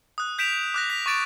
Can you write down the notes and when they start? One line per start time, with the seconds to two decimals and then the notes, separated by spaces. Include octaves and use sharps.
0.18 D#6 F#6
0.38 G6 B6 D7 E7 F7
0.74 D6 F#6 A#6
0.90 B6 F7
1.06 C#6 D6 A6 D7 E7